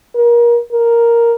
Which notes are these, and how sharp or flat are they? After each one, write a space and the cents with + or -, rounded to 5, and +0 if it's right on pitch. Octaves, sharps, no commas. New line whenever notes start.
A#4 +25
A#4 +0